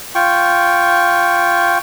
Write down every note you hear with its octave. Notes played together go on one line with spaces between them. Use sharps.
F4 G5 C#6